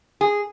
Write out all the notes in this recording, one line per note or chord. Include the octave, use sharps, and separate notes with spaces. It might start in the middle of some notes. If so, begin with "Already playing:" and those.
G#4